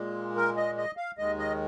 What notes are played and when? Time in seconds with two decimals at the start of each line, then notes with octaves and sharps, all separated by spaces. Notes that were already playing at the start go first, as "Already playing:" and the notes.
Already playing: A#2 G#3
0.36 A#4
0.57 D#5
0.77 D#5
0.97 F5
1.18 D#2 D#3 G#3 D#5
1.38 D#5